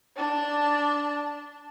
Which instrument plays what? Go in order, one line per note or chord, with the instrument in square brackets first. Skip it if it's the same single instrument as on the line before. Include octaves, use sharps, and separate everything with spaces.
[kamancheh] D4 A5